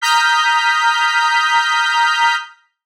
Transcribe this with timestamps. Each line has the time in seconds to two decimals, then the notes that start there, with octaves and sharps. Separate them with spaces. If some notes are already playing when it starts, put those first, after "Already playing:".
0.01 A#5 D#6 F6 G6 B6